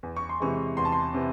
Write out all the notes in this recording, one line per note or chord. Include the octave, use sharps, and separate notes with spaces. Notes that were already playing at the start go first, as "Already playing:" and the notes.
E2
C#6
C6
C3 E3 G#3 C#6
E2 C6
A5
C6
C3 E3